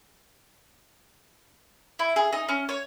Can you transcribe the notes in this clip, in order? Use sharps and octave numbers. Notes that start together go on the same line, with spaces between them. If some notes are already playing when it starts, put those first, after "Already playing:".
E4
G#4
D#4
C#4
C#5